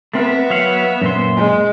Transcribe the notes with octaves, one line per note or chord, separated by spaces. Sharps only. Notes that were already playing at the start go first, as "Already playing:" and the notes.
A3 B3 C4 A#4 E5
F#3 F5 F#5
F#2 A#2 C5
G#3